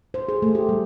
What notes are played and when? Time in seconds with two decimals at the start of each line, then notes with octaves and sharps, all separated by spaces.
0.14 C5
0.29 G#4
0.42 A3
0.55 G4
0.69 G3